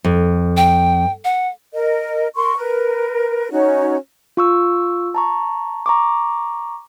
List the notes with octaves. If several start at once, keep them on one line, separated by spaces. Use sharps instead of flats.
F2
G5
F#5
A#4 D#5
A#4 C6 C#6
A#4 B4
C#4 D#4 F#4 C#5
F4 C#6 E6
A5 A#5 C#6
A#5 C#6 D6